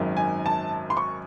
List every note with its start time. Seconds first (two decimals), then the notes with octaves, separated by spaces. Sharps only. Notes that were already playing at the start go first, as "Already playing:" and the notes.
Already playing: G#1 F#2 D#3
0.17 G#5
0.46 A5
0.90 C6
0.97 C#6